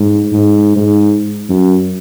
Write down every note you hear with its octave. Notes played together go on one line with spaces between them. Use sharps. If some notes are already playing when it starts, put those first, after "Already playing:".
Already playing: G#2
G#2
G#2
F#2